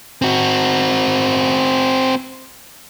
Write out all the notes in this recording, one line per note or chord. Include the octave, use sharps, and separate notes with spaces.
C4 F#4